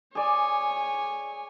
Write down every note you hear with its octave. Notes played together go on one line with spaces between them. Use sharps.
G#4 C#5 D5 G#5